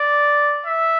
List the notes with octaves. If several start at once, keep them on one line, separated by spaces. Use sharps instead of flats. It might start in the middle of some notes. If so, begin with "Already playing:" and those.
Already playing: D5
E5